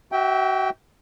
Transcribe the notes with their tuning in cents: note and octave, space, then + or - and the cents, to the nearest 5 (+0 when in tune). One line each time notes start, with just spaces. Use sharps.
F#4 +30 E5 -20 G5 +0